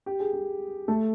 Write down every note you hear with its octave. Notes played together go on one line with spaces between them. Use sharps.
G4
G#4
G#4
A3 A4